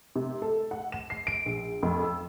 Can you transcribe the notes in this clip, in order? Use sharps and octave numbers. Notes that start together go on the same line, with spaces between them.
C3
A4
F#5
E7
C7
D7
A#1
F2
E6